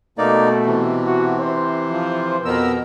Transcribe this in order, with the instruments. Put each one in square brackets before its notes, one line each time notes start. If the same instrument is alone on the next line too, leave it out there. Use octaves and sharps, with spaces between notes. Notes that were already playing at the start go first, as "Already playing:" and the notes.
[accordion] B2 [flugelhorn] A3 [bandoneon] A#3 D#4 D5
[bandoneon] C3 E3
[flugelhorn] F#4
C5
[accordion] F3
[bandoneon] F2 B2 [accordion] B3 A#4 E6